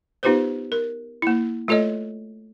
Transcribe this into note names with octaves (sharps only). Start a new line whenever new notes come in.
B3 D#4 F4 G4 B4 C5
A#4
A#3 E4
A3 F4 A4 C#5 D#5